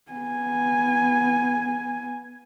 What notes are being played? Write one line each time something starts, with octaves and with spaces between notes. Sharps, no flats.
B3 G#5